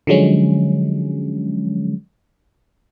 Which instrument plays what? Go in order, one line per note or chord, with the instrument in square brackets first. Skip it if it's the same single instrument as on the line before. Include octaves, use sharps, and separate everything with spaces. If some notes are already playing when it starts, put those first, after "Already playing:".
[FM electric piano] D3 F3 F#3 G#3 C#4